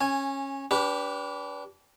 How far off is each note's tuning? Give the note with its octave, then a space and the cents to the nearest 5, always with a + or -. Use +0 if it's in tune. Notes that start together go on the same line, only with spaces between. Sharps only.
C#4 -20 G#5 +0
D4 -35 G4 +0 B4 +0